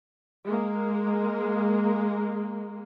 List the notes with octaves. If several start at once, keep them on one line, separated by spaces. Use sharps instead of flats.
G#3 A#3